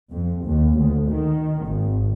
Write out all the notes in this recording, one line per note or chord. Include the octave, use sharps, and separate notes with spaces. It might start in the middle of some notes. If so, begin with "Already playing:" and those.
F2
D#2
D2
D#3
G#1